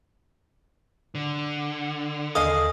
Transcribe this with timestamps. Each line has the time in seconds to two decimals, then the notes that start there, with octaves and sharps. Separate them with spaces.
1.15 D3
2.35 D#2 G#4 A4 D#5 F5 D#6